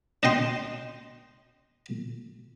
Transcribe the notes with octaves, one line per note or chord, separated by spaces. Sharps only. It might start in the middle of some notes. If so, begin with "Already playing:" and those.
D4 D#5 G5 C6